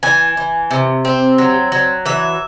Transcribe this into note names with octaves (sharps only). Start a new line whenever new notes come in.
E3 G#5
E3
C3
C4
F#3
F#3
E3 E5